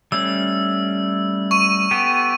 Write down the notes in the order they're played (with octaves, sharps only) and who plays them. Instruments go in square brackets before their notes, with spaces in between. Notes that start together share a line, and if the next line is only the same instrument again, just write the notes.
[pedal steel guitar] G3 A3 C#4 [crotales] E6
[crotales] C#6 D#7
[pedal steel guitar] B3 G4 A4